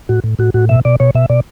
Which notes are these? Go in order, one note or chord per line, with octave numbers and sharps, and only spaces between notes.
A2 F#4
A2
A2 F#4
A2 F#4
B2 E5
B2 D5
B2 C#5
B2 E5
B2 D5